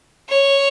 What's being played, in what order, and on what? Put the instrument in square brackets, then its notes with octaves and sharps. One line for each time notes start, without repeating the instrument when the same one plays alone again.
[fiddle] C#5